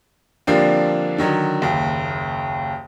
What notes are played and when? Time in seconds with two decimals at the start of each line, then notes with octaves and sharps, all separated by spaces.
0.47 D3 F3 G3 A#3 C4 D4
1.18 D3 D#3 F#3
1.62 F#1 D#2